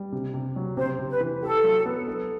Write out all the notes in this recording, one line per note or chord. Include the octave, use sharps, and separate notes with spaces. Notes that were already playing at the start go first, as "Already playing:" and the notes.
Already playing: G3
C3
C3
F#3
C3 C5
C3
B4
E3
G4 A4
F#3
B3
A4